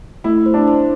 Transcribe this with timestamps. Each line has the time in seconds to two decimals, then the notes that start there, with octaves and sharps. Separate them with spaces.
0.24 A3 E4
0.46 C5
0.54 D4
0.68 C5